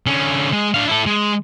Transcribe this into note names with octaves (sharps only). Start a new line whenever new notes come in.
D3 C#4
G#3
D4 F5
E4 A4
G#3